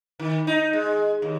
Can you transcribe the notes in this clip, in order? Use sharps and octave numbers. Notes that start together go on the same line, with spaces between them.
D#3
D#4
G#3
D#2